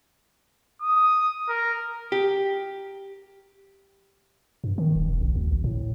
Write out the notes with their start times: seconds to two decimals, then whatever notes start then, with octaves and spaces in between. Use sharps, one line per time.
0.82 D#6
1.49 A#4
2.12 G4
4.64 G2
4.78 D#3
4.95 D#1
5.08 E1
5.21 A#1
5.36 D2
5.52 G#1
5.64 A2